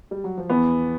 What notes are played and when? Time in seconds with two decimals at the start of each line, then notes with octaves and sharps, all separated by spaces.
0.11 G3
0.24 F#3
0.38 F3
0.50 E2 E3 B3